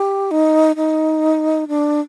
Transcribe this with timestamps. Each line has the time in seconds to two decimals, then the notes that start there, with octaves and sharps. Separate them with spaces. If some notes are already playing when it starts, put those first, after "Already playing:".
Already playing: G4
0.31 D#4
0.76 D#4
1.68 D4